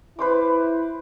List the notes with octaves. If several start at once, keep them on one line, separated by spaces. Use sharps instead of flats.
E4 B4 C5 D6